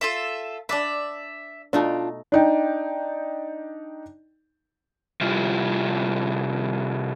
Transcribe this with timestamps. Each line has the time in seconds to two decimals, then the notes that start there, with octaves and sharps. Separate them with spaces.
0.01 F4 A4 E5
0.69 D4 B4 D5 E5
1.73 B2 A3 D4 D#4 F4
2.32 D4 D#4 G5
5.21 C3 G3 E4 F4 G4